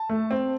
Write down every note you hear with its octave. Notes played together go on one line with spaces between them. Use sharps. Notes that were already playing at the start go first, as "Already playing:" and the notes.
Already playing: A5
A3
C4